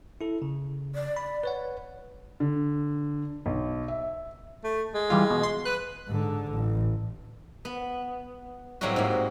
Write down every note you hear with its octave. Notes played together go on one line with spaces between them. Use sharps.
E4 A4
C#3
D5
B5
B4 C#5 F#5
D3
B1
E5
A3
G#3
E3 G3 F4
B2
C6
B4 F#6
G#2 D3
A1
B3
A2 F#3 G3 C4 F4 F#4
G#2 A#3